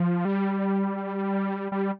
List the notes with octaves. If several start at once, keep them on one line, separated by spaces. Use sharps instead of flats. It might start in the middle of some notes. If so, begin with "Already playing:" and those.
Already playing: F3
G3
G3